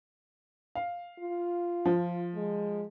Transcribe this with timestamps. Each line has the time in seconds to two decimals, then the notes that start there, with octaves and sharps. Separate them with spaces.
0.75 F5
1.20 F4
1.85 F3
2.35 G#3